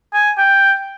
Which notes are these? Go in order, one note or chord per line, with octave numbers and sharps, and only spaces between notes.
G#5
G5